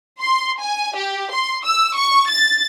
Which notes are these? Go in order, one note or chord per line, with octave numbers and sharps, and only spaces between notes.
C6
G#5
G4
C6
E6
C#6
A6